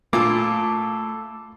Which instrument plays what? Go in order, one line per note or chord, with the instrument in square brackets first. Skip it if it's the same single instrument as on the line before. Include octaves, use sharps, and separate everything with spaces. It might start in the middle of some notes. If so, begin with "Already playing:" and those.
[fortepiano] A#2 [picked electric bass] A3 [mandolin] E4 F4 A4 [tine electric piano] D6